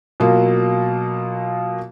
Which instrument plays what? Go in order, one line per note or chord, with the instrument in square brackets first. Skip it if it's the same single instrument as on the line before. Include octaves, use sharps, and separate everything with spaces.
[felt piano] B2 F#3 A#3 F4